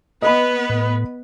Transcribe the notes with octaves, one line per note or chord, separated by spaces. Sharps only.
B3 B4 D#5 B5
A2